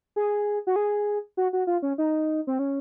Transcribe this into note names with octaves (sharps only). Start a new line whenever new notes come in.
G#4
F#4
G#4
F#4
F#4
F4
C#4
D#4
C4
C#4